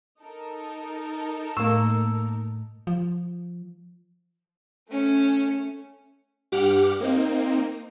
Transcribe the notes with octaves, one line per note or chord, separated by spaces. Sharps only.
D#4 A4 A#4
A2 A3 A#3 E6
F3
A3 C#4
G2 G4 F#5 D6 F6
A#3 C4 D#4